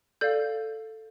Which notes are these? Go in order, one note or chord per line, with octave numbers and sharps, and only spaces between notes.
A4 D5 F5 G6